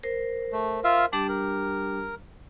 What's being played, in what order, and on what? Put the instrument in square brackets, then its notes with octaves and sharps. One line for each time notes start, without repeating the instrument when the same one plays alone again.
[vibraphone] A#4 C5
[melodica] A3
F4 E5 F5
[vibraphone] G3 D4 G4 [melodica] A5 D6
[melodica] A#4